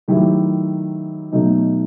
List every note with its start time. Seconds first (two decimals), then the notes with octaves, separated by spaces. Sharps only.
0.08 D#3 F#3 A3 E4 G4
1.32 B2 F#3 A3 D#4